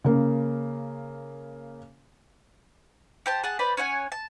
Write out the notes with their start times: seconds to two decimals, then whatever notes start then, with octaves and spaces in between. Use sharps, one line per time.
0.04 C#3 A#3
3.26 G4 C5 A5
3.44 G#4 F#5 A5
3.59 B4 C5 D5 B5
3.77 C#4 C#5 F#5 G#5
4.12 A5